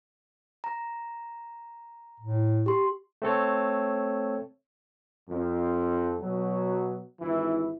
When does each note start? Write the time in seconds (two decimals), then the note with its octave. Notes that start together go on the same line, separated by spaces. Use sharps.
0.64 A#5
2.20 A2
2.66 G4 C6
3.22 A3 C4 A4 C#5
5.28 F2
6.21 B2 F#3
7.21 G#1 E3 E4